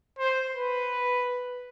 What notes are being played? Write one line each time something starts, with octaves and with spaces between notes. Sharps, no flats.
C5
B4